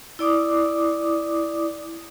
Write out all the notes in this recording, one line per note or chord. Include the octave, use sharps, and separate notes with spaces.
E4 D5 D6 D#6